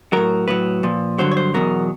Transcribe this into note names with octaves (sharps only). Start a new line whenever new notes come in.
A2 F#3 A#4
A2 F#3 B4
A#2 F3
G2 D3 F#3 C5
C#5
C5
E2 B2 F#3 A#4